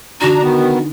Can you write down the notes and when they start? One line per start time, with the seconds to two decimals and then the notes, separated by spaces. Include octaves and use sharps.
0.21 D3 D4 D#4 F#4 A#5
0.42 D#3 B3